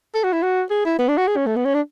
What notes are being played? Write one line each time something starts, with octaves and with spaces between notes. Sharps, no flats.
A4
F#4
E4
F#4
G#4
E4
B3
D4
F#4
G#4
C#4
A3
B3
C#4
D4